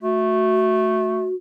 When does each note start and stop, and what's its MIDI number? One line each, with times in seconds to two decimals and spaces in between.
0.03 1.28 57
0.03 1.35 66